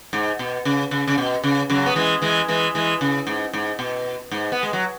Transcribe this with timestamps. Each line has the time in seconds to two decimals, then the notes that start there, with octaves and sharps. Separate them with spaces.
0.13 G#2
0.39 B2
0.65 C#3
0.91 C#3
1.07 C#3
1.18 B2
1.43 C#3
1.70 C#3 F#3
1.86 B3
1.95 E3 G#3
2.22 E3 G#3
2.48 E3 G#3
2.75 E3 G#3
3.01 C#3
3.27 G#2
3.53 G#2
3.79 B2
4.31 G#2
4.52 B3
4.63 G#3
4.73 F#3